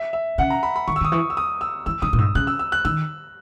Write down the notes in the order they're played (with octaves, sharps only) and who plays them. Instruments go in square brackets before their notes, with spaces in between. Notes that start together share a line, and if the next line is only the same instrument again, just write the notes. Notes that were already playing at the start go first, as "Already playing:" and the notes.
Already playing: [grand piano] E5
E5
[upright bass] C#3 [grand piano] F#5
[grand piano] A#5
B5
B5
[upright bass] D#3 [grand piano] C#6
[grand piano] E6
[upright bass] D#3 [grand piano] D#6
[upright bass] E3 [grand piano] C#6
[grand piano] E6
D#6
E6
[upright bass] E3 [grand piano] E6
[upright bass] D#3 [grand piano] D#6
[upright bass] A#2
[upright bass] G#2 [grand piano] E6
[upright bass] C#3 [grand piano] F#6
[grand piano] E6
E6
F#6
[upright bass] D#3 [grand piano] E6